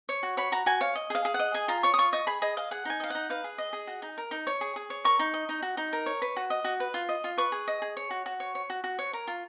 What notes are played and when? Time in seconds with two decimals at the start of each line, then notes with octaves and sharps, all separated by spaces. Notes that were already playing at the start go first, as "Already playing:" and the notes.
0.09 C#5
0.23 F#4
0.37 C#5 B5
0.52 F#4 A#5
0.66 F#4 G#5
0.81 C#5 F5
0.95 D#5
1.10 G#4 F5
1.25 G#4
1.34 F#5
1.39 D#5
1.54 G#4 G#5
1.68 F4 A#5
1.83 C#5 C#6
1.94 D#6
1.98 F4 C#6
2.13 D#5 C#6
2.27 G#4 B5
2.42 G#4 D#5
2.57 D#5 F5
2.71 G#4 F#5
2.85 D#4 G#5
3.00 D#5 F5
3.10 D#4 F#5
3.30 B4 F5
3.44 G#4
3.58 D#5
3.73 G#4
3.87 F#4
4.02 D#4
4.18 A#4
4.31 D#4
4.47 C#5
4.61 G#4
4.76 G#4
4.90 C#5
5.04 A#4 C#6
5.19 D#4
5.34 D#5
5.49 D#4
5.62 F#4
5.77 D#4
5.93 A#4
6.06 C#5
6.22 B4
6.36 F#4
6.50 D#5
6.64 F#4
6.80 B4
6.94 F4
7.09 D#5
7.24 F4
7.38 B4 C#6
7.52 G#4
7.68 D#5
7.82 G#4
7.97 C#5
8.11 F#4
8.26 F#4
8.40 C#5
8.55 C#5
8.70 F#4
8.84 F#4
8.99 C#5
9.13 A#4
9.27 F4